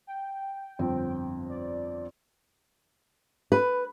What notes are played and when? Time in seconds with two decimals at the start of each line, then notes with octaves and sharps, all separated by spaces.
0.07 G5
0.79 G1 F2 C4
1.49 D5
3.52 B4